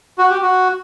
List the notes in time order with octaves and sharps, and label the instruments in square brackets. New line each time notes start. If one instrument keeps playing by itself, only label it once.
[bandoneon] F#4
G4
F#4